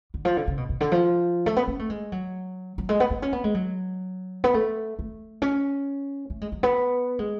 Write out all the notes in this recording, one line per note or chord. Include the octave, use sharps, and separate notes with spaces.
D3
F3
D3
C#3
B2
B2
D3
F3
A3
B3
C#4
A3
G#3
F#3
F#3
G#3
B3
B3
C#4
B3
G#3
F#3
B3
A3
A3
C#4
A3
G#3
F#3
B3
G#3